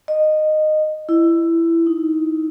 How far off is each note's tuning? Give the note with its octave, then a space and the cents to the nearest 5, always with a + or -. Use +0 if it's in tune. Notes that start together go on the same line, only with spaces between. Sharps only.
D#5 -15
E4 +15
D#4 +15